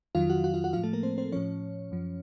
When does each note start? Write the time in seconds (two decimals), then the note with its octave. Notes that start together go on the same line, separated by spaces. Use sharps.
0.15 F2 D#3 F#3 F4 F5
0.30 F#4 F#5
0.44 F#4 F#5
0.54 F4 F5
0.64 F#4 F#5
0.73 A2 F3 F4 F5
0.83 A3 A4
0.93 A#3 A#4
1.03 C4 C5
1.18 C4 C5
1.32 A2 F3 C#4 C#5
1.92 F#2 F3